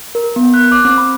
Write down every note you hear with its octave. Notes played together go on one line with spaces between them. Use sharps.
A#4
B3
F#6
D6
C4
B5